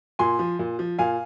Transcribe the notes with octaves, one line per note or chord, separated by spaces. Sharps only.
A#2 G#5 C6
F3
A#2
F3
A#2 F5 G#5